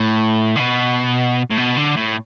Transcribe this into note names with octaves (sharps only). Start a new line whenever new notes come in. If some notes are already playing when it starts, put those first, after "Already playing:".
Already playing: A2
D3
B2
A2
B2
D3
A2